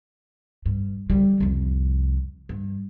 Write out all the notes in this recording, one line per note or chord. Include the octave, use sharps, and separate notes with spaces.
G2
D3 G3
C2 F2
G2